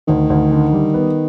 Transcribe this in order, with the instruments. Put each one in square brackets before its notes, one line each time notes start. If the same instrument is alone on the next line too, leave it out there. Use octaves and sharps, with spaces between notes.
[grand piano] D2 [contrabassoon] D#3
[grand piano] D2
D3
G3
B3